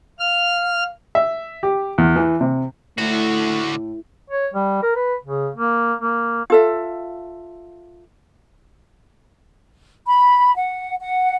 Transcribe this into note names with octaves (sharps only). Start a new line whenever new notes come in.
F5 F6
E5
G4
E2
E3
C3
A2 D3 A3 F#4
C#5
G3
A#4
B4
C#3
A#3
A#3
F4 A4 E5
B5
F#5
F#5